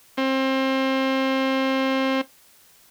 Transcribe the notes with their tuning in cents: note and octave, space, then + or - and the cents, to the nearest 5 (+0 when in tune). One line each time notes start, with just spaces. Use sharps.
C4 +25